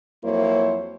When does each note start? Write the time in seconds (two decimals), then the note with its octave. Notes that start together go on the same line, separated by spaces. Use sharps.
0.24 F2 F#3 A#3 E4 C5 C#5